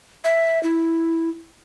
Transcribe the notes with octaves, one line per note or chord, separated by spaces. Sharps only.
E5
E4